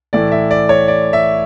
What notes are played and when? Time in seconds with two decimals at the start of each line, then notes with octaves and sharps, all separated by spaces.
0.13 A2 E3 A3 E4 D5
0.32 E5
0.51 D5
0.69 C#5
0.88 D5
1.13 E5